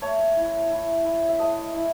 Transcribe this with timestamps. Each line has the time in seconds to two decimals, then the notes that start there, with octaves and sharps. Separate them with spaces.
0.01 A3 C#5
0.36 E4
0.71 E4
1.05 E4
1.29 E5
1.39 A3 D#5
1.74 E4